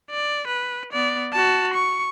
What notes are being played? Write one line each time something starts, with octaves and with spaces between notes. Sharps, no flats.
D5
B4
B3 D5
F#4 A5
C#6